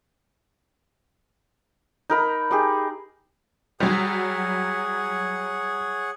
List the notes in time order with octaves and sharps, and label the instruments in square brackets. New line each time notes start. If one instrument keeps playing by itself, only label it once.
[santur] D#4 A#4 B5
D#4 G4 G#4
[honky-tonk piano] F#3 G3 [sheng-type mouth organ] G#4 C#5 F#5